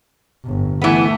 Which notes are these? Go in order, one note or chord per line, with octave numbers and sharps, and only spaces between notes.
G1 A2
E3 A3 B3